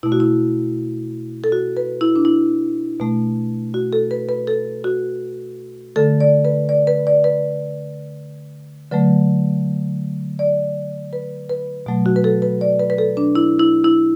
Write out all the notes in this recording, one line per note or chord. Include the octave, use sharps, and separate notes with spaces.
B2 A3 E4
F#4
E4
A4
F#4
B4
E4
D4
E4
B2 A3
F#4
A4
B4
B4
A4
F#4
D3 A3 A4
D5
B4
D5
B4
D5
B4
D3 F#3 A3 B4
D5
B4
B4
B2 F#3 A3
F#4
B4
A4
B4
D5
B4
B4
A4
D4
E4
E4
E4